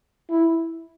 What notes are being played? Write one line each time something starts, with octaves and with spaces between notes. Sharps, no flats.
E4